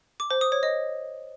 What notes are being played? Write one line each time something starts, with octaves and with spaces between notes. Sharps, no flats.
D6
C5
D#6
C#5
D#5